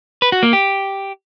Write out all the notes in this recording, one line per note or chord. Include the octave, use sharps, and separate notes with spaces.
B4
F#4
A#3
G4